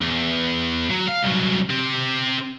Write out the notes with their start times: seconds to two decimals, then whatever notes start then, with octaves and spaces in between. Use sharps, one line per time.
0.02 E2
0.90 F#3
1.08 F5
1.22 C2 F#3
1.70 C4 G4